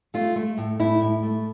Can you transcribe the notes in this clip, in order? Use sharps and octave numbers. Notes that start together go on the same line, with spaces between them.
A3 F4
A3
A2
A2 E4
A2
A3